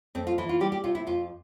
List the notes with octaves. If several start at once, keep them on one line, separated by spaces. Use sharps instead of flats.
F2 C4
F4
E3 E4
F4
G3 G4
G4
C3 F4
E4
F2 F4